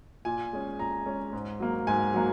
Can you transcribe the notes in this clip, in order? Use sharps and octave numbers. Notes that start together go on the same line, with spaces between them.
A#2 G#5
G#3 C#4
A#2 A#5
G#3 C#4
G#2
F#3 A#3
G#2 G#5
F#3 A#3